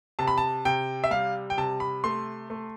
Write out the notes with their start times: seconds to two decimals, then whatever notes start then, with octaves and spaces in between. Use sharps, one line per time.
0.19 C3 A5
0.27 B5
0.38 A5
0.65 C3 G5
1.04 E5
1.11 G3 F5
1.50 G5
1.58 C3 A5
1.80 B5
2.04 A3 C6
2.50 A3